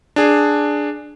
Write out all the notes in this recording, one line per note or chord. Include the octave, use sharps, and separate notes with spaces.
D4 G#4